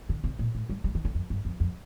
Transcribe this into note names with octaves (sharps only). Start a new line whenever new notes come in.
D3
C3
A#2
A2
G3
G3
D#3
D3
F2
G2
F2
F2